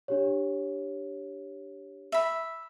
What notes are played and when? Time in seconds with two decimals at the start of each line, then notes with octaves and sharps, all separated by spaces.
0.08 D4 G4 C#5
2.12 E5 B5